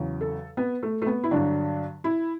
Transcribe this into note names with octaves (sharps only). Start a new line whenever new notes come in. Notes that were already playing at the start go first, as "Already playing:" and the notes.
Already playing: E2 C#3 F#3
A4
B3
A3
A3
B3
E4
G2 D3 F#3 D4
E4